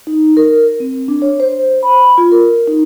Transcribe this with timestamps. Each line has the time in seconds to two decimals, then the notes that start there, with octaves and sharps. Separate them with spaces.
0.07 D#4
0.37 A#4
0.80 C4
1.08 D4
1.22 C#5
1.40 C5
1.83 B5
2.18 F4
2.32 A#4
2.68 D#4